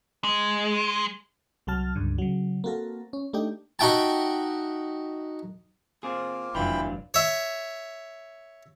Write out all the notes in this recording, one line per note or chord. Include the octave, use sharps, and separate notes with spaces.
G#3
C2 F#3 F#4 A5 F6
C#2 G2 D3
C#3 F#3
A#3 C4 F#4 A4 A#4
C#4
A3 D4 D#4 G4 G5
D#4 F#4 E5 G5 A5
A#3 C4 F4 G#4
F1 E3 F#3 D4 F4 G5 B5
C#5 E5